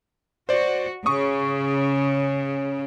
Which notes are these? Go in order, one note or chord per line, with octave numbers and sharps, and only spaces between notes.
F#4 C5 D5
C#3 C#6 D#6